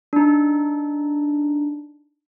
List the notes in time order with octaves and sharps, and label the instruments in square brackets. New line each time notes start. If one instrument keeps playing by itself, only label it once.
[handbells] D4 D#4